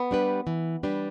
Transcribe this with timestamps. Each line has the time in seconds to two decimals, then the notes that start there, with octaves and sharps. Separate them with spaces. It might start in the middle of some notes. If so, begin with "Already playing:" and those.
Already playing: B3
0.11 G3 D4 G4 B4
0.47 E3
0.83 G3 D4 G4 B4